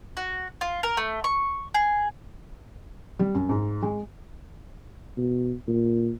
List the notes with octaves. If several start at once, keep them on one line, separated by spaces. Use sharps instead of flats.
F#4
F4
A#4
A3
C#6
G#4
G3
F#2
G#2
G#3
B2
A#2